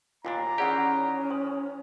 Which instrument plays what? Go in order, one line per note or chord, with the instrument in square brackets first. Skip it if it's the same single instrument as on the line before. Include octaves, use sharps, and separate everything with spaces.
[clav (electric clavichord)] D#2 A#2 D4 [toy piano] F4 [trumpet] A#5
[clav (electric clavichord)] D#3 E3 G4 [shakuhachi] C#4 [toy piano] G#4 D5 F#5
[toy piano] C5 C6 D#6